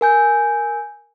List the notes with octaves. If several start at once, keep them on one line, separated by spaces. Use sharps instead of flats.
A#4 G#5 G6